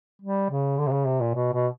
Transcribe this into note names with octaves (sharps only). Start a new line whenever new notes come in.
G3
C#3
D3
C3
C#3
C3
A#2
B2
B2